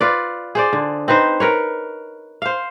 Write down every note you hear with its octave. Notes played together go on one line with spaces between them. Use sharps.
F4 B4 D5
G#4 C5 D5
D3
C4 D#4 B4 C5
A#4 B4 C#5
C5 F5